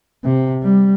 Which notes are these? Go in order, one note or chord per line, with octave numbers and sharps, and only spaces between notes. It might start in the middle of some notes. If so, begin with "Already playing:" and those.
C3
G3